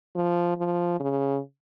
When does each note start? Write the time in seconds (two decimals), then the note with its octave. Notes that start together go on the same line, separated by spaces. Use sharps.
0.15 F3
0.58 F3
1.00 C#3